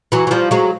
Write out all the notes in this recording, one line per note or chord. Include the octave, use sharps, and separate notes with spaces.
E3 F#3
F#3
F3 G3
F#3 G#3